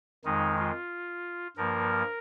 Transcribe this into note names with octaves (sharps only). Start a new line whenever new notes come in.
F2 D#3 G#3 D#4
F4
G2 F3 A#3 A#4